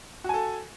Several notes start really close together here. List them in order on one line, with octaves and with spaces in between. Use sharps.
F#4 G#5 A4